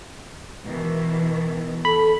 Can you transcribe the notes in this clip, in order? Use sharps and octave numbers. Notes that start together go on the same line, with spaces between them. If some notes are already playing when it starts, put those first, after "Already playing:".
B2 D#3 E3
A4 B5